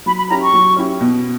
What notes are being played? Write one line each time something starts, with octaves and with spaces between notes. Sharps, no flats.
F#3 B5
B5
C#4 E4 G4 A#5
C#6
F#3
C#4 E4 G4
B2